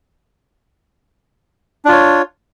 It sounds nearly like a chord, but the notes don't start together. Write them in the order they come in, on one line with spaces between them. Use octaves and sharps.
D4 F4 C#5